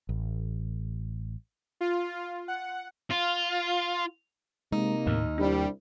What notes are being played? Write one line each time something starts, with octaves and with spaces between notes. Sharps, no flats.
A1
F4
F#5
F4
C3 G#3 A#3 D#4
D#2 A2
C2 G3 D4